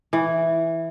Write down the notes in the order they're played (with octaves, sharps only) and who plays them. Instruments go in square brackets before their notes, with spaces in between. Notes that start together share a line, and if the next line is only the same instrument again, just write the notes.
[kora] E3